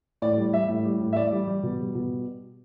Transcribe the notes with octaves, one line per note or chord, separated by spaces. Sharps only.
A2 D5
G3
G3 E5
A2
G3
A2
E5
A2 D5
G3
G3
B2
G3
B2